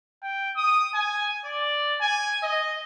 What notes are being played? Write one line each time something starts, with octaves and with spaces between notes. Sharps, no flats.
G5
D#6
G#5
D5
G#5
D#5